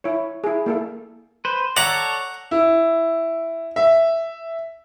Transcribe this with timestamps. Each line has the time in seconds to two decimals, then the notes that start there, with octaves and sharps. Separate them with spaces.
0.04 E4 C#5
0.44 E4 G#4
0.66 A#3 E4 A4
1.45 B4 C5
1.77 A4 C#5 D5 F#5 A#5
2.51 E4
3.76 E5